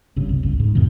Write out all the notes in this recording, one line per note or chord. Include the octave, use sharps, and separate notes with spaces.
G1 G2 C#3
C2
G1 C#2
G#2
E2 G#2 B2 D#3